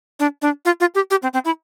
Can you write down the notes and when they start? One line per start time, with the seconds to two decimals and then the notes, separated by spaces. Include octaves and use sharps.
0.19 D4
0.42 D4
0.65 F4
0.80 F4
0.95 G4
1.10 G4
1.23 C4
1.33 C4
1.45 E4